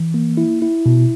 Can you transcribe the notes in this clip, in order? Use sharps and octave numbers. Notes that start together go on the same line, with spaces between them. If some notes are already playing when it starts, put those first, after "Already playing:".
Already playing: E3
A#3
E4
E4
B2